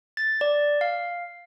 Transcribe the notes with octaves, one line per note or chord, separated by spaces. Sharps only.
A6
D5
F5